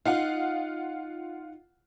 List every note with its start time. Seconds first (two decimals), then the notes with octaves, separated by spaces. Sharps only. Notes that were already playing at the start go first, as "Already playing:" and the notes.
0.05 D#4 F4 F5 F#5